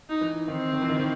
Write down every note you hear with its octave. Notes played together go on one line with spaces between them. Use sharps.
D#4
E3
D#3 C4
D#3
E3
D#3
D#3